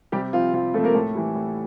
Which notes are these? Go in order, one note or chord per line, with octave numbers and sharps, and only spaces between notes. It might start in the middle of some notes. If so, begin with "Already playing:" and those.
C3 G3 G4
F3 C4 F4
C3 F4
F3 A3 C4 A4
A#3 A#4
A2 A3 A4
E3 G3
A2